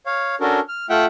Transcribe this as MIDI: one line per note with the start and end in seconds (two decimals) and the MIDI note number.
0.06 0.35 73
0.06 0.35 77
0.41 0.60 61
0.41 0.60 62
0.41 0.60 66
0.41 0.60 69
0.41 0.60 70
0.69 0.86 89
0.90 1.06 57
0.90 1.06 65
0.90 1.06 76
0.90 1.06 78
0.90 1.06 79